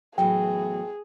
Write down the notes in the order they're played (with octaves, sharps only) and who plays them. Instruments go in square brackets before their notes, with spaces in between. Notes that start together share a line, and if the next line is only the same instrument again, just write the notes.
[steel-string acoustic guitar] E2 A2 F#3 [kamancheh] G#4 [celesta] G5